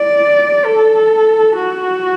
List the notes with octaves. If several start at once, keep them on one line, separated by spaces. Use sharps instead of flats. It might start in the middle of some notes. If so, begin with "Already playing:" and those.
Already playing: D5
A4
F#4